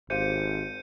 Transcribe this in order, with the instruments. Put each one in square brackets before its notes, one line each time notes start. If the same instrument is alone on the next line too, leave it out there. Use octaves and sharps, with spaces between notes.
[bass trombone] G#1 [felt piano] G4 C5 F5 [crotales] G6 C#7 D#7